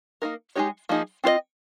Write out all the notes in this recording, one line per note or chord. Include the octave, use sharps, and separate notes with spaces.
A#3 D#4 A#4
G#3 D#4 G4 C#5
F3 A#3 D#4 G#4
C4 F4 C5 D#5